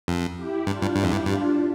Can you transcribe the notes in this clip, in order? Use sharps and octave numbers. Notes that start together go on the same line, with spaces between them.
F2
E4 G4
G2 D4 F4
G2
G2 E4 G4
F2
G2
G2 D4 F4